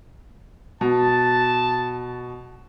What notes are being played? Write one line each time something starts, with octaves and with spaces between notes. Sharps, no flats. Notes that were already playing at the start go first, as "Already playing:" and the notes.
B2 A5